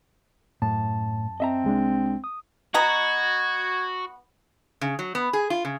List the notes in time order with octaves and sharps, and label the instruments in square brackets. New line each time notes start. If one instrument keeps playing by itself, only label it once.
[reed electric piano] F#2 A5 [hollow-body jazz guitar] A2
[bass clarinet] C4 [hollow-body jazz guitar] D#5 E5 A#5
[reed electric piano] C2 G#3 D4
D#6
[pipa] B3 D#5 A#5 [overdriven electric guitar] F#4 [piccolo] G#6
[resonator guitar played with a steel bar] C#3
F#3
B3
G#4
F4
C#3